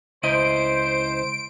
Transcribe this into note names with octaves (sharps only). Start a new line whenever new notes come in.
C#2 E4 C5 D#5 D7